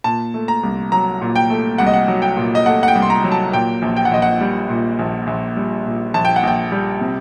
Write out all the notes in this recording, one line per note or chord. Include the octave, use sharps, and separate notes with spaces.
A#2 A5
A3
A#5
C2
F#3 A#5
A#2
G5
A3
C2 F#5
D#5
F#5
F#3
G5
A#2
D#5
A3 F#5
F#5
G5
C2
C6
A#5
F#3
A5
A#2 G5
A#1
G5
F#5
A#1 D#5
F#5
G3
A#2
A#1
A#1
G3
A#2
A#1 A5
G5
F#5
A#1 G5
G3
C3